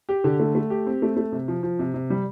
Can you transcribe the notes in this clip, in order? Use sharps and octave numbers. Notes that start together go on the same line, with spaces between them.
G4
D3
A3
A3
G4
C4
A3
A3
C3
F3
F3
C3
C3
G3